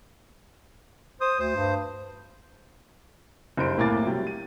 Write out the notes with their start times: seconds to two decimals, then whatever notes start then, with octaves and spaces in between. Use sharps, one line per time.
1.21 C5 D#6
1.39 D2 C5
1.56 G2
3.57 F#1 G2 C5 D7
3.77 C2 A2 A#3 G#5 D6 A6
4.06 C3 F#3 G3
4.27 D#7